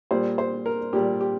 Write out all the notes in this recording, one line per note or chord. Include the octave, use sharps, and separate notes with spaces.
A#2 G3 C5
C5
A#4
A#2 G3 G4
G4